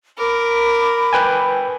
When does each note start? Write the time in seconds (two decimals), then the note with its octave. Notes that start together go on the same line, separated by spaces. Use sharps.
0.18 A#4 B5 D6
1.13 B4 G5 G#5